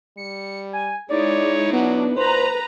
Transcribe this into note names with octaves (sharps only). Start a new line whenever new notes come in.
G3 C#7
G#5
G#3 D#4 E4 C#5 D5
F#3 B3 D4
A#2 B4 C5 A#5